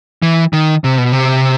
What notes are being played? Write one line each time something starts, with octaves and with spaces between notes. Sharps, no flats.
E3
D#3
C3
B2
C3